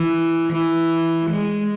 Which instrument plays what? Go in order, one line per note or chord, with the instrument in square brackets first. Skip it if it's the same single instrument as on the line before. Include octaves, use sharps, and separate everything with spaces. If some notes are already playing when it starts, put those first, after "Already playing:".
Already playing: [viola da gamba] E3
E3
G#3